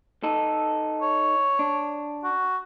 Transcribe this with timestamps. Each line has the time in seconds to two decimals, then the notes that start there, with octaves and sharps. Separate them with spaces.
0.23 D#4 A4
1.02 C#5
1.59 D4
2.24 F#4